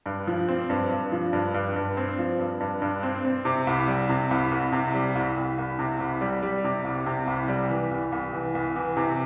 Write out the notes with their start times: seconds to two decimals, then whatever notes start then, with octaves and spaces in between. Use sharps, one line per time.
0.06 G2
0.27 F3
0.49 C4
0.70 G2
0.91 G2
1.12 F3
1.33 G2
1.54 G2
1.76 G2
1.97 C4
2.18 F3
2.39 G2
2.60 G2
2.82 G2
3.03 C4
3.25 C4
3.45 C3
3.67 C2
3.87 G3
4.09 C3
4.31 C2
4.51 C2
4.72 C3
4.94 G3
5.15 C2
5.37 C2
5.58 C2
5.79 C3
6.00 C2
6.21 G3
6.42 G3
6.64 C3
6.84 C2
7.06 C3
7.27 C2
7.48 G3
7.70 E3
7.91 C2
8.12 C2
8.33 E3
8.55 C2
8.76 E3
8.97 C3